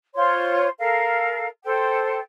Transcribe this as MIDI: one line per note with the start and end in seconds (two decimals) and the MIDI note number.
0.15 0.68 65
0.15 0.68 72
0.15 0.68 73
0.15 0.68 84
0.78 1.46 69
0.78 1.46 70
0.78 1.46 77
1.64 2.19 69
1.64 2.19 72
1.64 2.19 79